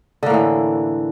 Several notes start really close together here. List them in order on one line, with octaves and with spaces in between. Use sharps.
D3 A#3 A2 E3